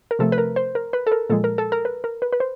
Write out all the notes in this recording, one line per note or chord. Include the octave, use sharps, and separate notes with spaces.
A#4
C3 F3 A3 A4
B4
A#4
C5
A#4
B4
A4
A#4
A#2 F3 G#3 A4
A#4
A4
A#4
B4
A#4
B4
B4
C5